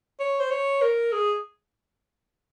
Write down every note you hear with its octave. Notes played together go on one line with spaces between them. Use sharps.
C#5
C5
C#5
A#4
G#4